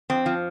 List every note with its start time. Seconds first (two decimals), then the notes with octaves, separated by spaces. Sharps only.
0.10 F2 C4
0.26 F3